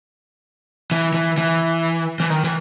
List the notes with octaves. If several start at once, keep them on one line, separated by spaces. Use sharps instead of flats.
E3
E3
E3
E3
D#3
E3